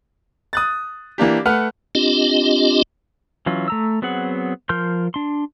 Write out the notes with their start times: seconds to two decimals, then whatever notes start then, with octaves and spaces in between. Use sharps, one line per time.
0.53 D#6 F#6 A6
1.18 E3 A#3 D4 G4
1.45 A3 B4 F#5 F6
1.95 C4 D4 F4 G4 D#5
3.46 E3 F#3 C#4 F4
3.68 A3 A#5 E6
4.02 F#3 B3 C4 G#4 F#5
4.69 F3 A#4 C6 F6 G6
5.14 D4 C6